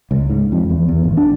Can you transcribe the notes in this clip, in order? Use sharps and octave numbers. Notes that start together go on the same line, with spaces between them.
C#2
G#2
F2
E2
E2
G#1
D4